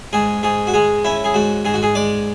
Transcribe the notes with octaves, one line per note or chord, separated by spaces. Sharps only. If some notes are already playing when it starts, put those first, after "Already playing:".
G#2 G#4
G#2 G#4
F#4
G#3 G#4
C#4 E4
G#4
G#2 F#4
G#2 G#4
F#4
G#4
G#3 D5